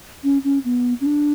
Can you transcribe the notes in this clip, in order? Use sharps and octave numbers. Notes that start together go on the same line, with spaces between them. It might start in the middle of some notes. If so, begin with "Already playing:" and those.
C#4
C#4
B3
C#4
D4